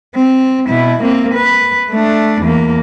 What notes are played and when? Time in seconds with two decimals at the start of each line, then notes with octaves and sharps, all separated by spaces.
0.15 C4
0.69 B2 E4
1.02 A#3 C4
1.34 B4
1.90 A3 D4
2.41 E2 A#3